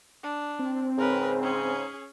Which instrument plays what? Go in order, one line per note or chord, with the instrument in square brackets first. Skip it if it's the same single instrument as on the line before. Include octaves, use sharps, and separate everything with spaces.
[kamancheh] D4
[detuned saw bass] C4
[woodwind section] G#2 C#3 [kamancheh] A#4 B4
[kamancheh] C#4 G#4